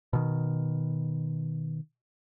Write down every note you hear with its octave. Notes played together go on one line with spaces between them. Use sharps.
B2 D#3